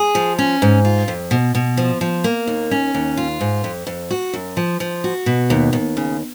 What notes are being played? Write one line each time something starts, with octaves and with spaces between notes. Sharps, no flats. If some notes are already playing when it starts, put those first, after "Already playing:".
Already playing: G#4
F3
C#4
G#2
F4
F2
B2
B2
F3
F3
A#3
D#2
C#4
D#2
F4
G#2
F2
F2
F#4
F#2
F3
F3
F#4
B2
D#2
D#2
C#3